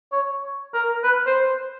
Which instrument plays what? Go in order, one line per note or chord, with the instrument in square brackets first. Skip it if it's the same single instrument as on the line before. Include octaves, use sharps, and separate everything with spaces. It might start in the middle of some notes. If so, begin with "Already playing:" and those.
[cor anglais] C#5
A#4
B4
C5